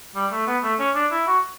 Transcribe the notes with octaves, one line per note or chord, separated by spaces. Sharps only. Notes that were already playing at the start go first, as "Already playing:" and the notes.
G3
A3
B3
A3
C#4
D4
E4
F#4